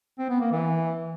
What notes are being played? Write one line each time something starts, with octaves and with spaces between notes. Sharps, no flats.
C4
B3
A#3
E3